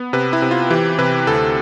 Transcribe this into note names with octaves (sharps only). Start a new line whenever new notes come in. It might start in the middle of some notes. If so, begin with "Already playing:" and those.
Already playing: B3
C3 B4
E4
C3
F4
E3 G4
C3 B4
D2 A4